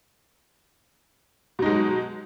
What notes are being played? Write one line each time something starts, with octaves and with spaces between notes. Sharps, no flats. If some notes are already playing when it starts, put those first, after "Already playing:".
B2 F#3 G#3 D#4